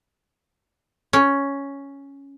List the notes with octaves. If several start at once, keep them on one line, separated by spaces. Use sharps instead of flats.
C#4